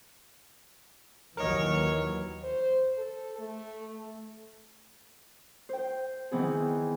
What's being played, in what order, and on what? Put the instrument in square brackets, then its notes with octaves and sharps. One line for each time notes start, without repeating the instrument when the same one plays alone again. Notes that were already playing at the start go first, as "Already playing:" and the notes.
[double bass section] D#2 E3 F#3 [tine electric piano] A#4 D#5 [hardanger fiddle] C#5
[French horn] C5
A4
A3
[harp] C5 G5
D#3 E3 B3 C4 G#4